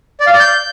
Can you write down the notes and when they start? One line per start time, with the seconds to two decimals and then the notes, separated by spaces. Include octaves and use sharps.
0.20 D5
0.27 F5
0.33 D5
0.40 G6